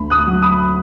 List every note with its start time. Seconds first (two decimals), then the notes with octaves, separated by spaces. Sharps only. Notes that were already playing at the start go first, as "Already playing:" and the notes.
Already playing: D2 B5
0.10 D#6 F#6
0.27 F#3
0.42 B5 D#6